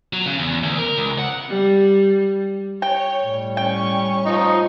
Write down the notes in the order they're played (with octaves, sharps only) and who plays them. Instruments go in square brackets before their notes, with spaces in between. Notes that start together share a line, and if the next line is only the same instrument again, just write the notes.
[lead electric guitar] F#3
C#3
E2
D2
A#4
C#2
F#5
[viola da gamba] G3
[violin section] C#5 [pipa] G5
[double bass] A2 G3
[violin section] C#4 C#6 [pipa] G5
[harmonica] F3 D#4